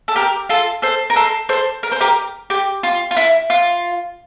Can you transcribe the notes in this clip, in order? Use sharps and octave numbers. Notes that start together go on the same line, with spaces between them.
A4
G4 A#4
F4 A4
A4 C5
A#4
A4 C5
A4 C5
A#4
C5
G4 A#4
G4
F4
F4
E4
F4